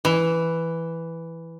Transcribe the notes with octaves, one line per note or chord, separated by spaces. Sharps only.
E3